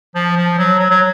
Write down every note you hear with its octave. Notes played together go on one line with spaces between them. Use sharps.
F3
F3
F#3
F#3
F#3